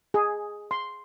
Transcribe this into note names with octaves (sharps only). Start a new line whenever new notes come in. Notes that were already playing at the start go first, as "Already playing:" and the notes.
G#4
C6